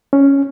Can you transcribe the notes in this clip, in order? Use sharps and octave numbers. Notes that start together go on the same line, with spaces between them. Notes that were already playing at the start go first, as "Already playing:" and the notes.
C#4